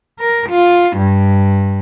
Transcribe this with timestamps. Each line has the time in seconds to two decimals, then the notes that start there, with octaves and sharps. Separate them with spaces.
0.19 A#4
0.50 F4
0.97 G2